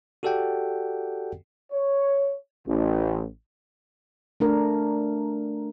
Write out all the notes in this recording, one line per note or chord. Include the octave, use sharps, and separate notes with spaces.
F#4 G4 A4 D5 F#5 G5
C#5
A1
A3 D4 A#4